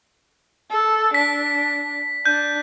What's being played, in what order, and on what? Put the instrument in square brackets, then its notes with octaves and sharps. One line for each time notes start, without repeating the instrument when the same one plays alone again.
[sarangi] A4
[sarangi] D4 [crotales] B6
[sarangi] D4 [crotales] G6